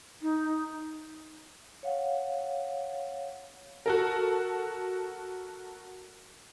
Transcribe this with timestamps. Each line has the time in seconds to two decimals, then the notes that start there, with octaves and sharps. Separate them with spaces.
0.22 D#4
1.83 C#5 F5 F#5
3.86 F#4 A4 A#4